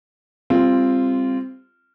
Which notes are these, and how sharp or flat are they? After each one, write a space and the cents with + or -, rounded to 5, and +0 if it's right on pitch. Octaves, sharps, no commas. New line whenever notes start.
G3 +25 C4 +0 F4 -15